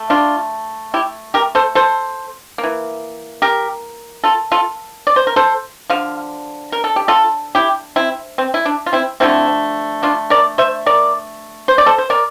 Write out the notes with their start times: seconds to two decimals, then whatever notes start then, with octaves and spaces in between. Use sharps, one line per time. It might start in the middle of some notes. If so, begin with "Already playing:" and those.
Already playing: A3
0.10 D4 F4
0.94 E4 G4
1.34 G4 A#4
1.55 A4 C5
1.75 A4 C5
2.58 A#3
2.63 E3
3.42 G4 A#4
4.24 F4 A4
4.52 F4 A4
5.07 D5
5.16 C5
5.27 A#4
5.36 A4 C5
5.90 D3 F3 F5
6.72 A#4
6.84 A4
6.96 G4
7.08 F4 A4
7.55 E4 G4
7.96 C4 E4
8.38 C4
8.54 E4
8.65 D4
8.86 F4
8.93 C4 E4
9.20 D3 F3 A3 C4 E4
10.03 D4 F4
10.30 A#4 D5
10.58 C5 E5
10.86 A#4 D5
11.68 C5
11.78 D5
11.86 A4 C5
11.98 C5
12.10 A#4 D5